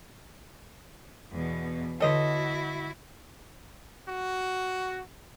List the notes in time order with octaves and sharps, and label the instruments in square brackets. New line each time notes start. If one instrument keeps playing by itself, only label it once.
[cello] E2 B2
[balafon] D3 C#5 [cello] E4 F#4 [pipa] A4 D#5
[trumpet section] F#4